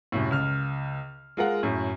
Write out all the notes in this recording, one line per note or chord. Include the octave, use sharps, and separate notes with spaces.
C2 F#2 A2
C#2 F6
G#3 F4 A#4 F#5
F#2 A2